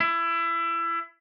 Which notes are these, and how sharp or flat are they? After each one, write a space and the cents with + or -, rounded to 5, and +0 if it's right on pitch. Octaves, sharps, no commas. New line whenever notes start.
E4 +25